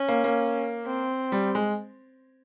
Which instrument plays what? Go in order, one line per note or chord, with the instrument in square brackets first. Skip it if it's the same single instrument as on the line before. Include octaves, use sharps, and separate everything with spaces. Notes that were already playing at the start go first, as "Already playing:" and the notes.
Already playing: [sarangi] C#4
[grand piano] A#3
A#3
[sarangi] C4
[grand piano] G3
G#3